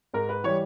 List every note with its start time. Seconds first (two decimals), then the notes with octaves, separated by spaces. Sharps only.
0.13 G#2 A#4
0.29 B4
0.44 E3 G3 C#5